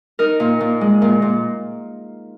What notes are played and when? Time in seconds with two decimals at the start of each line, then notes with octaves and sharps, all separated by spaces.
0.19 D#4 A#4
0.40 A#2
0.61 A#2
0.81 G#3
1.02 A#2
1.22 A#2